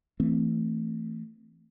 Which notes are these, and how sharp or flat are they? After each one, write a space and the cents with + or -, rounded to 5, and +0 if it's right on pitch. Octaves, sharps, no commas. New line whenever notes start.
E3 +0 A3 +20 C4 +10